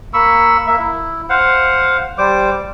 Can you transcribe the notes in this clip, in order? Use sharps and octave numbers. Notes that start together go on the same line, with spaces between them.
A#3 B5 C#6 E6
A#3 E5
E4
C5 F5 F#5
G3 C5 D6